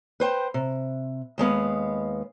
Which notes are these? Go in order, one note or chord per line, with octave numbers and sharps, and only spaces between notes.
B4 C5 G5
C3
D#2 G#3 B3 F5